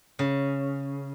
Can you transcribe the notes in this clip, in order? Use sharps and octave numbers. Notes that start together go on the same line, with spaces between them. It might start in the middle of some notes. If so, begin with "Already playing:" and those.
C#3